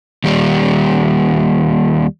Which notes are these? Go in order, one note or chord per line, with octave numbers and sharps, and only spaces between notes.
D#2 G3